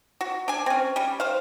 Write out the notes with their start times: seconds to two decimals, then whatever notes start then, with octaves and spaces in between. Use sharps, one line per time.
0.21 F#4
0.48 D4 G#5
0.66 C4 C#4
0.96 G3 C#4
1.20 C5 F5